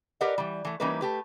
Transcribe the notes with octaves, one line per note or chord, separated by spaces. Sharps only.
G4 A#4 B4 D5 D#5 F#5
E3 G3
E3 A3
E3 G3 A#3 C#4 D#4 B4
A3 G4 B4